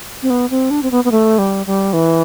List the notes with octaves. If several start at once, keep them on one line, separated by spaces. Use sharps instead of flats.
C4
B3
C4
D4
C4
B3
B3
A3
G3
G3
E3